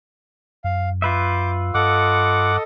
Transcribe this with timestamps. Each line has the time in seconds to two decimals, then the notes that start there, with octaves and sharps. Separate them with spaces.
0.64 F#2 F5
1.02 F4 B4 E5 D6 G6
1.74 G2 A4 D#5 F#5 D6